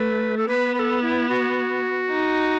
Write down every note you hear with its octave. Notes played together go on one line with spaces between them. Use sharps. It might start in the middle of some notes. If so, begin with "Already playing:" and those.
Already playing: A3 B4
A4
B3 B4
B4
A4
E4
F#4
D#4